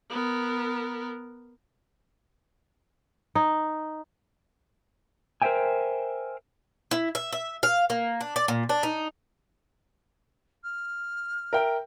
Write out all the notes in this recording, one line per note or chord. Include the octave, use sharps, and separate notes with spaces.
B3 A#4
D#4
A#4 C5 D#5 E5 G5 G#5
E4
E5
E5
F5
A#3
D4
D5
A#2
D4
D#4
F6
A#4 E5 G5